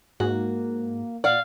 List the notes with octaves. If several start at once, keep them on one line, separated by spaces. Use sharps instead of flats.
G#2 A#3 F#4
A#2 D5 F5 F#5